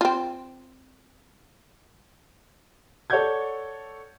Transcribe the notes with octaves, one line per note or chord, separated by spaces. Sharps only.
C4 F4
A4 C#5 D5 F#5 G6 G#6